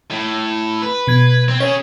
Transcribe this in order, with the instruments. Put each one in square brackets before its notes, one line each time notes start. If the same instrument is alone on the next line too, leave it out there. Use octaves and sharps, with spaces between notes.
[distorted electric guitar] A2
B4
[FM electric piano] B2 G#6
[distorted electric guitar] C4
[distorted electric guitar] C#4 G#4 [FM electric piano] C#5